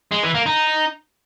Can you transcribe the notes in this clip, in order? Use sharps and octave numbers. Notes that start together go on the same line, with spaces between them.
G#3
E3
A#3
D#4